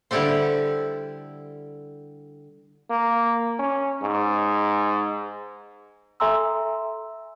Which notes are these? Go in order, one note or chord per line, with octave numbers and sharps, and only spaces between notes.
D3 G3 E4 G4 A4 C5
A#3
C#4
G#2
A4 E5 G#5 A#5 C6 E6